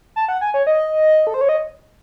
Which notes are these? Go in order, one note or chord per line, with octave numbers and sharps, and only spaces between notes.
A5
F#5
G#5
C#5
D#5
A4
C5
C#5
D#5